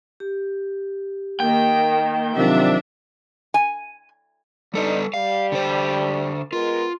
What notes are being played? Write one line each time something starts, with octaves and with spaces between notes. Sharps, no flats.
G4
D#3 A#3 G5
C3 D#3 F3 F#3 D4 E5 F5
G#5
G3 D4 D#4 A4 B4
G3 F5
D3 C5
G#3 B3 F4 A#4